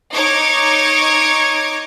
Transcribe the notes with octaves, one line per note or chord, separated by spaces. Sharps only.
D#4 C#5 D6 G#6